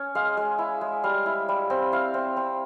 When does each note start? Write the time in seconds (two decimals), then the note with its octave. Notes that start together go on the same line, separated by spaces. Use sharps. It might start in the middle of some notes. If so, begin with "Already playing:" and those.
Already playing: C#4
0.15 G#3 F5
0.37 G#3
0.58 E4
0.81 G#3
1.04 G3 F5
1.26 E4
1.49 G3
1.70 C4
1.92 E4 F5
2.14 C4
2.37 C4